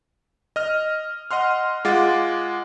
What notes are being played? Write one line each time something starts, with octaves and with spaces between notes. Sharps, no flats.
D#5 F6
D#5 F#5 C6 F6
G#3 F4 F#5 D6 A6